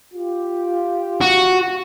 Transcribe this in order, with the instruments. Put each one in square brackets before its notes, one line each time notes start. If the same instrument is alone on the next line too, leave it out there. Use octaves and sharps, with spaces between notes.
[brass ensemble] F4 G4
[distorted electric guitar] F#4